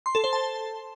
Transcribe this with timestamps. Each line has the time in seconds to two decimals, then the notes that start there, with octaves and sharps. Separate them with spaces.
0.06 C6
0.15 A4
0.24 C5
0.33 A5